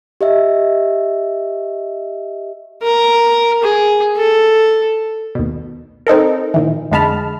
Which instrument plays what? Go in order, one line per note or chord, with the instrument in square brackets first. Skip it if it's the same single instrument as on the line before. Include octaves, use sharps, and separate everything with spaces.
[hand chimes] G4 D#5 E5
[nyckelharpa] A#4
G#4
A4
[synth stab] D#2 B2
C4 D#4 A4 A#4
A#2 D#3 E3
F2 D3 G#3 A5 B5 F6